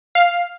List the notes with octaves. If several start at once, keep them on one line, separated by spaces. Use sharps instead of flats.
F5